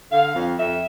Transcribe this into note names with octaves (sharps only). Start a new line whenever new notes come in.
D3 F5
F2
F2 E5